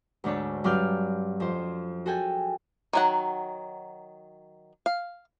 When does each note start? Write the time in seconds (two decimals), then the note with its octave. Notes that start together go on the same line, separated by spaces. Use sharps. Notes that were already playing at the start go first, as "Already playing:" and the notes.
0.24 D2 G#2 D4 C#5 A5
0.64 G2 F#3 C#4 D5 F6 G6
1.40 F2 C5
2.06 F#4 G#4 A4 G5 G#5
2.93 D#3 F#3 F#5
4.86 F5